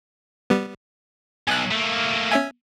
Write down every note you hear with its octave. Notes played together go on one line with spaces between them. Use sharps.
G3 B3
B1 G#5 F#6
A3 A#3
C#4 E5 G#5